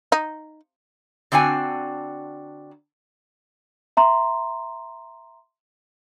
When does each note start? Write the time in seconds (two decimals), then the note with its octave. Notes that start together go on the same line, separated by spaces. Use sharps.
0.12 D#4
1.32 D3 C4 D4 F#4 G#5
3.97 E5 A#5 C6